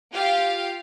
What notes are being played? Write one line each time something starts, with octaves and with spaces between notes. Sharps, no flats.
F4 G4 F5